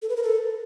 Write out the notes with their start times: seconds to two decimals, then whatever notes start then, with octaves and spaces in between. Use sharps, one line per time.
0.02 A4
0.09 B4
0.16 A#4
0.23 A4